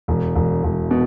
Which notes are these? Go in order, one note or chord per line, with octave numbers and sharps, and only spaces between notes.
E1
E1
E1
B2